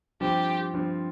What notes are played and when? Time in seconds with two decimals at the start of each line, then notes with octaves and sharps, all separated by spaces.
0.21 G2 F3 C4 G4
0.74 G2 F3 C4